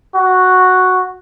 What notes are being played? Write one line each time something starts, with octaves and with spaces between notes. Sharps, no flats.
F#4